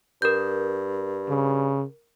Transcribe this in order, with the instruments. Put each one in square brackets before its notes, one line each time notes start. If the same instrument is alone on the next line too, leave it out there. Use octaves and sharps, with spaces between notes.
[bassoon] G2 [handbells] A#4 G6
[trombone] C#3